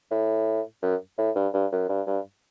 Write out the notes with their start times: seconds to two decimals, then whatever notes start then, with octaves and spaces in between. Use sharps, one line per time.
0.11 A2
0.83 F#2
1.18 A2
1.36 G2
1.54 G2
1.72 F#2
1.89 G2
2.07 G2